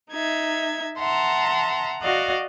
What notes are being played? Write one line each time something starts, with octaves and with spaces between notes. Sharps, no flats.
D#4 E5 G#6
E5 F#5 A5 A#5 C6
F#4 D5 D#5 F5 F#5